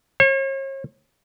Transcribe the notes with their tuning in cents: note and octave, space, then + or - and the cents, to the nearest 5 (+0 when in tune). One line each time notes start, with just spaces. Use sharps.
C#5 -40